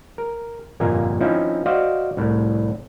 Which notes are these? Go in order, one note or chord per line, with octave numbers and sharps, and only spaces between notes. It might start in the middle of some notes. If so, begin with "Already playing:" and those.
A#4
G1 F2 A#2 A#3 G#5 A#5
F3 C4 C#4 D#4 E4
F#4 C5 D5 D#5 F5
C2 A2